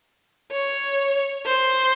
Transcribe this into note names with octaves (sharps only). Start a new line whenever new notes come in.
C#5
C5